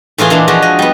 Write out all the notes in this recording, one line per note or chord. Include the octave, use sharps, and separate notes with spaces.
A2 E3 F4 G#4
A#2 E3 G#3 D4
F3 G#3 F#4
D#5
G3 B3